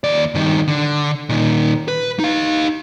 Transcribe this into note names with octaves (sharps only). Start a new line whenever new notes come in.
D#2 D5
G2 D#3
D3
A#2 D#3
B4
D#4 F5